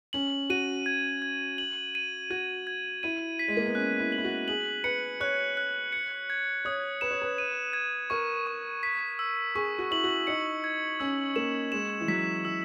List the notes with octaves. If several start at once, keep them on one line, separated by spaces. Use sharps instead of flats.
C#4 F#7
F#4 D#7
G#6
G#6
F#7
D#7
F#4 G#6
G#6
E4 D#7
B6
G#3
A#3
B3
C#4 F#6
E4
F#7
E4
F#4
G#4 F#7
B4 C#7
C#5 F#6
F#6
C#7
G#6
C#5 D#6
B4 E7
C#5
B4
D#7
G#6
A#4 C#6
C#6
B6
E6
G#4 C#6
F#4
E4 F#7
F#4
D#4 C#7
G#6
C#4 E6
A#3 E7
G#3 E7
E3
F#3 B6
E3 E6